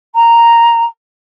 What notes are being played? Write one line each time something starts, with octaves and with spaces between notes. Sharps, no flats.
A#5